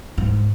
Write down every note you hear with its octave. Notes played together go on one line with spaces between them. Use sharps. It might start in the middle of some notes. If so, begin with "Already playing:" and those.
G#2